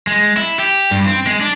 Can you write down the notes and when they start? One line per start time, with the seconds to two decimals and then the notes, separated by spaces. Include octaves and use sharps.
0.07 G#3
0.37 E4
0.59 G4
0.91 G2
1.06 C4
1.27 G#3
1.41 D4